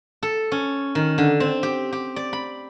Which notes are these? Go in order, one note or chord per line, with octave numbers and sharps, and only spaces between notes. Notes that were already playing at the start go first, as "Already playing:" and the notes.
A4
C#4
D#3
D3
C4
G4
G4
D5
B5